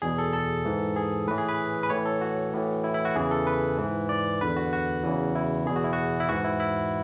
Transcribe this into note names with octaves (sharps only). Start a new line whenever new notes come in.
E2 B2 G#4
A4
A4
G#2 E3
G#4
A2 E3 B4
G#4
B4
B4
A2 E3 C#5
A4
F#4
A2 E3
E4
E4
F#4
E2 C#3 E3 G#4
A4
B4
G#2 E3
D5
E2 D3 B4
F#4
F#4
E2 C#3 E3
E4
E2 B2 G#4
F#4
E4
F#4
E4
G#2 E3 F#4
E4
E4